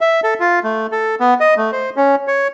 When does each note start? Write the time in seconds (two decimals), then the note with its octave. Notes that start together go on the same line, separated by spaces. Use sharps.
0.01 E5
0.24 A4
0.40 F4
0.64 A3
0.92 A4
1.20 B3
1.40 D#5
1.57 A3
1.72 C5
1.96 C#4
2.28 C#5